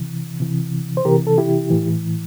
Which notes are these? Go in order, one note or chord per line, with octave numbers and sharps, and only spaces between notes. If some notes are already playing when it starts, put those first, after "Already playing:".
Already playing: C3 E3
C3 E3
C5
C3 E3 G4 A#4
A4
E4 G4
A2 E3